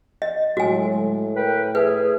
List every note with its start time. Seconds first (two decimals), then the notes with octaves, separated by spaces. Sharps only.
0.22 D#5
0.57 A2 D3 F#3 G#3 F#4 G#5
1.35 A#4 B4 G5
1.75 G#4 B4 E5